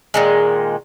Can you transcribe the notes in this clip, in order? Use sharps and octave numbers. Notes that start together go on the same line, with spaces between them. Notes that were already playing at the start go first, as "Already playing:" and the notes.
A#2 D#3 G#3